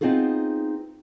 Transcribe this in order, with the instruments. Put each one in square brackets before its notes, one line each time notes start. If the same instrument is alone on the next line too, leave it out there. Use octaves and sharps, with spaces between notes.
[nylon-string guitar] B3 C4 D#4 F4 G#4 A4